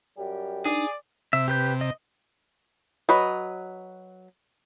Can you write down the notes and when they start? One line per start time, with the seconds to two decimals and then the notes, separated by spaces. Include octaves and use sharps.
0.17 F#2 G3 G4
0.65 D4 D#4 G#4 D5
1.33 C3 E5
1.48 G4 B4 G6
1.81 D#5
3.09 F#3 B4 D#5